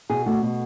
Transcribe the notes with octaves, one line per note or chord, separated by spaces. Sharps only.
B2 G#4
A3 F#4
B2